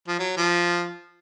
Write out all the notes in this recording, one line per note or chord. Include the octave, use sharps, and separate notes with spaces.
F3
F#3
F3